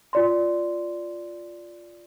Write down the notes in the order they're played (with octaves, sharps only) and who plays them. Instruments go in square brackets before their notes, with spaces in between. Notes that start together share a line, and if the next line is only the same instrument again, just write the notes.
[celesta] F4 D5 C6